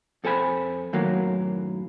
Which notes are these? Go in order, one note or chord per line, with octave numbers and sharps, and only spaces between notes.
F2 A4 C5 G#5 B5
F#2 A2 D#3 F#3 A#3